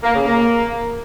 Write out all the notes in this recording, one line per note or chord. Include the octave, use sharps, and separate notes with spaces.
A#3
C#3
A#3